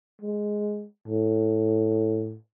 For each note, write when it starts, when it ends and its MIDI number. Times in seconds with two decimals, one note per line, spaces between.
0.22 0.86 56
1.08 2.36 45